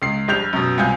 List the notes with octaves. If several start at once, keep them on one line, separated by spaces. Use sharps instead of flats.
C#2 C7
A#1 G3 G6 F7
F#2 B2
C2 F4 G#5 G6